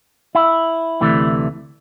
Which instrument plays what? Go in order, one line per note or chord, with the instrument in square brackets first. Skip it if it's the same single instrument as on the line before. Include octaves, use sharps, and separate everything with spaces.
[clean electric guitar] E4
D2 C3 E3 A3